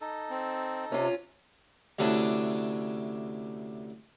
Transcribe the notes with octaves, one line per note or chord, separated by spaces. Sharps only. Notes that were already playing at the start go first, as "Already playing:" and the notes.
D#4 A4
C4
C3 C#4 F4
D2 C3 C#4 D4 E4 D5